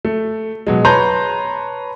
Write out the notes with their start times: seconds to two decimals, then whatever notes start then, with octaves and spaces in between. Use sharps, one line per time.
0.05 A3
0.67 B2 F#3 G#3
0.85 B4 C#5 A5 A#5 C6 G6